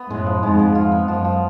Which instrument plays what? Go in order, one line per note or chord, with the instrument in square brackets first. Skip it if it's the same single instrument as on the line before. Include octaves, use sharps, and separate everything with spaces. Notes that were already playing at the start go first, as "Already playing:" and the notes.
Already playing: [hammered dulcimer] B3
[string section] F#2 A2 [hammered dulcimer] G#3
[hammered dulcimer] F3
[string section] F2 G#2 [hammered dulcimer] G#3
[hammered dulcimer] G#3
[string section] F2 [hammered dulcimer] F4
[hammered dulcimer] B3
[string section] F#2 [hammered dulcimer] F3
[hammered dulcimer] F3